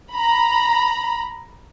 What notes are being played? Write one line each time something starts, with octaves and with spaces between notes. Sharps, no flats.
A#5 B5